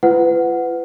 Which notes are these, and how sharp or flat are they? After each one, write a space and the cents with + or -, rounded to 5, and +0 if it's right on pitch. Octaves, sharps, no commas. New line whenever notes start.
F4 -40 B4 +30 F#5 +0